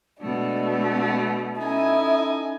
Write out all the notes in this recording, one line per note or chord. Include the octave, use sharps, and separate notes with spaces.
B2 G#3 A3 D4
C#4 D#4 E4 A4 G#5 D#6